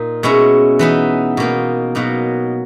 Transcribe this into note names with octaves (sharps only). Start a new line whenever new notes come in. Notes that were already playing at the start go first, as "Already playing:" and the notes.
Already playing: A#2 D#4
B2 G#3 C#4 E4
E3 B3 D#4
B2 A#3 D#4
B2 F#3 A#3 D#4